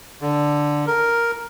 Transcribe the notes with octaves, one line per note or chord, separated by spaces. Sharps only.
D3
A#4